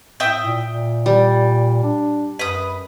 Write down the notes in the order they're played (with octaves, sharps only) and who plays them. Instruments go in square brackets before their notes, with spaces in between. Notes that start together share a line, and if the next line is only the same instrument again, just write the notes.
[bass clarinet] A2 [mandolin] E5 G5 D#6
[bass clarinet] A#2
A#2
[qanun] G3
[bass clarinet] D4
[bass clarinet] F#2 [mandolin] B4 D#6